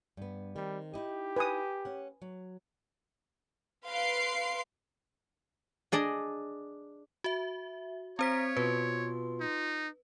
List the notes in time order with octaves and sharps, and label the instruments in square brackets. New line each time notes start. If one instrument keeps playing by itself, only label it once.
[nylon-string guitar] G2 B3
[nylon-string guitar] D#3 C4 [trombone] G3
[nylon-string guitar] D#4 E4 D#5 [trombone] G4
[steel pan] B4 G#5 D#6
[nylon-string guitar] C#4 F#5
F#3
[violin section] B4 F5 C6 C7 D7
[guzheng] D4 G#4 D5 D#5
[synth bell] F#4 E5
[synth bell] C4 C5 B6 [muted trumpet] C#5 [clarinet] A#5
[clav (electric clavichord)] B2 [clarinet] F4 [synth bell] B4
[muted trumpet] D#4